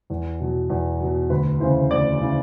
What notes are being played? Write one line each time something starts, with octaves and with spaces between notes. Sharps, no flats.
E2
B2 F#3
E2
B2 F#3
D2 B4
C#3 E3 C5
D2 D5
C#3 E3